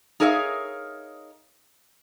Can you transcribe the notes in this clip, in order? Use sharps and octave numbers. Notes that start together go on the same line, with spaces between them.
D#4 G#4 A#4 C#5 E5 F5